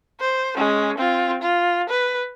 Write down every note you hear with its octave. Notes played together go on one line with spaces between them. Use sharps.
C5
G#3 C#4
C4 F4
F4
B4